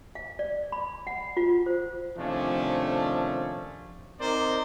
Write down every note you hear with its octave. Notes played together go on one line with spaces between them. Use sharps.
F5
D5
B5
F#5
F4
C5
C3 D#3 F3 A3 C#4 D4
C4 D#4 A#4 C5 D5